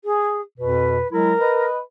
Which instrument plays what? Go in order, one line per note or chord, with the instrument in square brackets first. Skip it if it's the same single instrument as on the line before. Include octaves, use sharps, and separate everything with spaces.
[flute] G#4
[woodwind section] F2 B2 [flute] B4
[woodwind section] F#3 G#3 E4 [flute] A#4
[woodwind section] B4 D#5